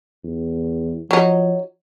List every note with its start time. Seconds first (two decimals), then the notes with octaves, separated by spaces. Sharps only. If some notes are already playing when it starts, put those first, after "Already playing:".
0.24 E2
1.11 F3 F#3 D#4